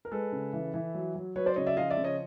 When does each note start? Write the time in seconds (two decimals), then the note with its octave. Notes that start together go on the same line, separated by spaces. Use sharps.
0.05 A#4
0.11 G#3 A4 B4
0.32 C#3
0.53 E3
0.74 E3
0.95 F#3
1.15 F#3
1.36 F#3 B4 C#5
1.46 C5 D5
1.56 C#3 C#5 D#5
1.66 D5 E5
1.77 F3 D#5 F5
1.90 D5 E5
1.97 C#3
2.04 C#5 D#5